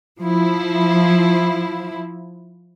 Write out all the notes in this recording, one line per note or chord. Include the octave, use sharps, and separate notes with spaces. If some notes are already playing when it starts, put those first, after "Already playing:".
F3 E4